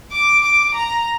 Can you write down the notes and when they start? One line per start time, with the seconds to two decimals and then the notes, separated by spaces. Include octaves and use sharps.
0.12 D6
0.43 D6
0.75 A#5